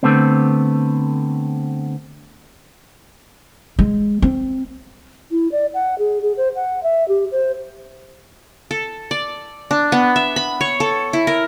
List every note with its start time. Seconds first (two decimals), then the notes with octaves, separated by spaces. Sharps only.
0.03 D3 A3 B3 C4
3.79 G#3
4.22 C4
5.31 E4
5.51 D5
5.74 F#5
5.98 G#4
6.22 G#4
6.37 C5
6.55 F#5
6.83 E5
7.08 G4
7.31 C5
8.71 A4
9.11 D5
9.71 D4
9.92 B3
10.16 E5
10.36 B5
10.61 C#5
10.80 A4
11.13 E4
11.27 A#4